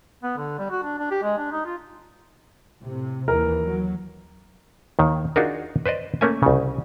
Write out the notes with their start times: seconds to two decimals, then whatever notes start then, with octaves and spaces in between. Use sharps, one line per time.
0.23 B3
0.37 D3
0.59 G3
0.70 F#4
0.83 D4
0.99 D4
1.11 G4
1.23 G#3
1.38 D4
1.52 D#4
1.65 F4
2.83 A2 C3
3.28 D#2 E3 A#4
3.64 F#3
4.99 D#2 D#3
5.36 D4 D#4 F4 F#4 G#4 A#4
5.86 B4 C5 D5 D#5
6.21 A3 A#3 C#4 A#4 E5 G#5
6.43 C2 C#3